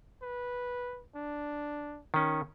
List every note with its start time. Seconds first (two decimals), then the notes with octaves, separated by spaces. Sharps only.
0.22 B4
1.16 D4
2.14 D#3 C#4